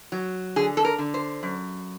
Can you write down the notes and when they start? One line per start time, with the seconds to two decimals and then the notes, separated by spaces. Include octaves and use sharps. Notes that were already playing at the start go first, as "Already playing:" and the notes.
0.12 F#3
0.56 D3 G#4
0.77 A4
0.85 A#4
0.98 D3
1.14 C5
1.43 F#2